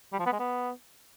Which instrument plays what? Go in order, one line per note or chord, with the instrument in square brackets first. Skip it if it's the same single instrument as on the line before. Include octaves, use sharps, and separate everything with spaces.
[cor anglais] G3
F3
B3
G#3
B3